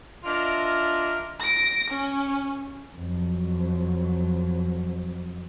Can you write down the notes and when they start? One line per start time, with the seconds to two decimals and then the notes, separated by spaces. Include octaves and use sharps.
0.24 D4 F4 A#4 D#5 E5
1.40 A#6 D7
1.90 C#4
2.95 F2 F#3